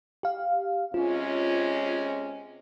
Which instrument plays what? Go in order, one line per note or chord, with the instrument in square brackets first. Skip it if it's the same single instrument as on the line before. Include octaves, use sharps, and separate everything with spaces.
[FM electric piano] G4 F5
[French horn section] C3 G#3 C#4 [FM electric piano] F4